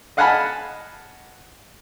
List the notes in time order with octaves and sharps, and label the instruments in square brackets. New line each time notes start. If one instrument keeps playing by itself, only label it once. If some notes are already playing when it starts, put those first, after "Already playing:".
[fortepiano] D#5 F5 F#5 G#5 A5 B5